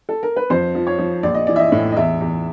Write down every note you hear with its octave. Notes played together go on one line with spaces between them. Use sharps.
A4
A#4
B4
F2 C5
F3
C#5
F3
A#1 D5
D#5
E3 D5
E5
D#5
A2
D#5
E2 E5
E2